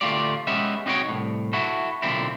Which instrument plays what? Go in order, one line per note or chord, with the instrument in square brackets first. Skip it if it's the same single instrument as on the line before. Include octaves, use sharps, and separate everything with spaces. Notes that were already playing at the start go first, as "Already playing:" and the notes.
[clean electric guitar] D2 A3 D4 F4 G4 D5
G#3 B3 C#4 G4 E5
C4 D#4 F#4 C5 C#5 G5
C2 A2
E4 F#4 A4
B1 A#2 D3 C4 E4